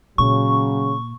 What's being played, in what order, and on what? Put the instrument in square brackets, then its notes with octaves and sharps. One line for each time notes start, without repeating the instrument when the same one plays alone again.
[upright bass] A#2 [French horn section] C#3 F#3 [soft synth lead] C#6